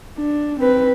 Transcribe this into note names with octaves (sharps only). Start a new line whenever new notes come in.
D4
C4 B4